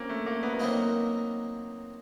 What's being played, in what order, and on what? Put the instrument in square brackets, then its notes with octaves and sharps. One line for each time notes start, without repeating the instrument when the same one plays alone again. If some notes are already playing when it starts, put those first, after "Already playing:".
Already playing: [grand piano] A#3 C4 C#4
A3
A#3
B3
B3
[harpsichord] D#3 F#3 A#3 D#4 [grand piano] C4